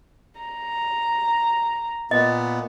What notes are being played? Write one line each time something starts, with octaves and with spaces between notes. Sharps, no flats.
A#5
A#2 B3 D#5